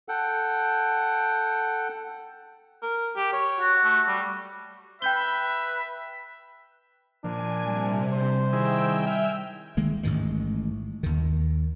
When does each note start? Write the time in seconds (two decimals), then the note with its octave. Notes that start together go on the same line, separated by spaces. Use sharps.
0.08 A4 F#5 G5
2.82 A#4
3.16 G4
3.33 C#5
3.60 F#4
3.84 A3
4.07 G3
5.02 B4 E5 G5 G6 G7
7.24 A#2 F3 D4 G#5
7.68 C3 G3
8.13 C5
8.53 D#3 E4 G#4 G5 E6
9.07 E5 G#5 F6
9.77 D#3 G#3 A#3
10.03 A1 G#2 D#3 G#3
11.03 D#2 D#3